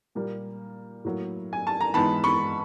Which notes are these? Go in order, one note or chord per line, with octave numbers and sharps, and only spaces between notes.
A#2 G3 A#3
A2 F#3 A#3
G#5
A5
A#5
G#2 E3 G#3 B3 A5 B5
B5 C#6